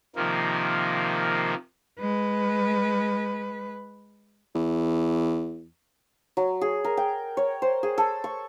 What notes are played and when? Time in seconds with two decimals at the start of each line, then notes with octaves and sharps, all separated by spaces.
0.16 C3 D#3 F3 A#3
1.99 G#3 B4
4.55 E2
6.37 F#3
6.61 G#4
6.84 A#4
6.97 G5
7.37 C#5
7.62 C5
7.83 G#4
7.98 A4
8.24 C#6